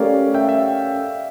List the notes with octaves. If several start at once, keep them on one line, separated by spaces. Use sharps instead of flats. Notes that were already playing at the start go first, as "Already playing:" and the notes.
Already playing: A3 C#4 G4 A#4 D5 F5
E5 G5
E5 G5